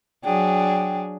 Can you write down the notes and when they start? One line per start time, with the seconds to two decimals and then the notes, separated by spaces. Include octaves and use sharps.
0.24 F#3 D4 G#4 G5